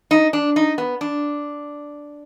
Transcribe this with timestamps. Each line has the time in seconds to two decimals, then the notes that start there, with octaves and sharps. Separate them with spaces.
0.11 D#4
0.33 D4
0.56 D#4
0.78 B3
1.01 D4